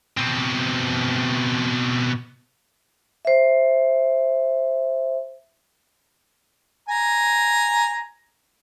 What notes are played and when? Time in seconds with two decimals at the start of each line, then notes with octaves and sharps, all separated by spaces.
0.17 B2 C4
3.25 C5 E5
6.89 G#5 A#5